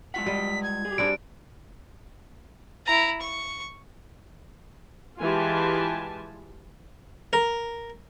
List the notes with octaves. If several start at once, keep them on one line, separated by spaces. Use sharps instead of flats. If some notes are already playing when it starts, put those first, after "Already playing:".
G#3 F4 F#5 B6
G3 D#5
G#6
G4 G#4
G3 C4 D4 D7
E4 A#5
C#6
E3 G#3 F4 G4 G#5 A5
A#4